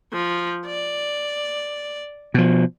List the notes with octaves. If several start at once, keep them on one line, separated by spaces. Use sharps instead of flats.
F3
D5
B2 F3